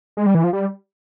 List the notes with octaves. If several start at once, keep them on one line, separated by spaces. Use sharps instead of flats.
G#3
G3
E3
F3
G3